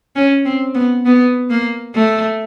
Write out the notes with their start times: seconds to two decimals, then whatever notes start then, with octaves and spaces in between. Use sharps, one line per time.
0.16 C#4
0.45 C4
0.75 B3
1.06 B3
1.50 A#3
1.95 A3